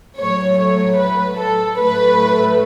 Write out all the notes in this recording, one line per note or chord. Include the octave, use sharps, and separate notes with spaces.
A2 F#3 A3 C#5
C#5
B4
A4
A2 F#3 A3 B4